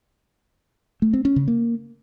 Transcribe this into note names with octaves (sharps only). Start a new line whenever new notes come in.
A3
C4
C#4
C#3
A#3